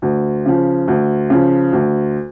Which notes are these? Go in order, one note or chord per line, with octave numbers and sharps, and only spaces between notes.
D2
C#3 F3
D2
C#3 F3
D2